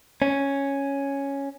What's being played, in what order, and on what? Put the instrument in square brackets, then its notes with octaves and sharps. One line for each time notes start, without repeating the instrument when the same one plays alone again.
[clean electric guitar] C#4